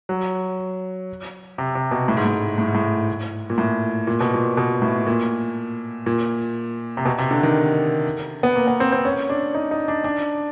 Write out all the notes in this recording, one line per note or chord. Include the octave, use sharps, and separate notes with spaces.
F#3
C3
C3
B2
A2
G#2
A2
A2
G#2
A2
A#2
A2
A#2
B2
A#2
B2
A2
A#2
A#2
C3
B2
C3
D3
D#3
B3
A#3
B3
C4
C4
C#4
D4
D#4
D#4
D4
D4